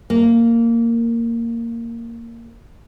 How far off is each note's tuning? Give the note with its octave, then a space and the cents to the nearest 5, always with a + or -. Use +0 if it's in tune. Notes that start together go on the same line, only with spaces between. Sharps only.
A#3 -10